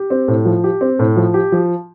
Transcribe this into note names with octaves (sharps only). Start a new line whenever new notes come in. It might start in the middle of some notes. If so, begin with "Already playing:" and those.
Already playing: G4
C4
A2
F3
G4
C4
A2
F3
G4
F3